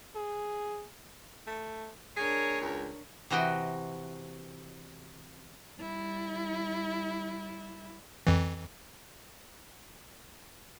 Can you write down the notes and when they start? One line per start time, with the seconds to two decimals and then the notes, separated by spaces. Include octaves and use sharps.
0.15 G#4
1.47 A3
2.16 D4 G#4 A#4 C#5
2.61 C#2
3.30 C3 E3 F#4 D#5 G5
5.78 G3 E4
8.27 F2 E3